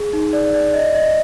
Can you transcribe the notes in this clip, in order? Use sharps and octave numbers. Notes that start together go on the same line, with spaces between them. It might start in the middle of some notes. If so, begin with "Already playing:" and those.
Already playing: G#4
D#4
D5
D5
D#5
D#5